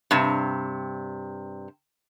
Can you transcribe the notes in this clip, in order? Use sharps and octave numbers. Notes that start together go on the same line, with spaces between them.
G2 C3